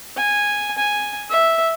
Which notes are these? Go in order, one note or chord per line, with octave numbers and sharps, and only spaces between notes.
G#5
G#5
E5